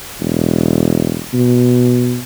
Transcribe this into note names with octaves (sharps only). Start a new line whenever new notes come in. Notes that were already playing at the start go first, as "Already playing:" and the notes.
E1
B2